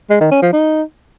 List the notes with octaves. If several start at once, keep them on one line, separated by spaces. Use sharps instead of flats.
G#3
D#3
C#4
F3
D#4